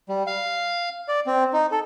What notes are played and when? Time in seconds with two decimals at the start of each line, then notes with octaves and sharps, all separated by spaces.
0.09 G3
0.27 F5
1.08 D5
1.27 C4
1.53 D#4
1.71 A4